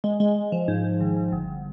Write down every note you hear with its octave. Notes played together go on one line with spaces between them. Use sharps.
G#3
G#3
G#3
F3
G#2
G#2
G#1
G#1
G1